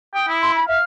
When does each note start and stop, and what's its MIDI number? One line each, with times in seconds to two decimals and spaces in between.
0.14 0.28 79
0.14 0.36 87
0.28 0.58 64
0.41 0.52 84
0.41 0.52 88
0.56 0.67 83
0.68 0.78 76
0.68 0.84 77